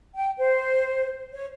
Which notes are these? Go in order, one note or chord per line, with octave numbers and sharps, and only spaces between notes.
G5
C5
C#5